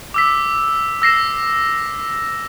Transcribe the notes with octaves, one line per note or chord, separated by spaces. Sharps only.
D6 E6 B6
E6 A#6 C7 E7